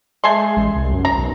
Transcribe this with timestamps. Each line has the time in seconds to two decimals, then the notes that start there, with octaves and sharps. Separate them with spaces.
0.24 G#3 A3 G#5 C6
0.57 A1
0.75 C2
0.93 F#2
1.05 A#5
1.17 B1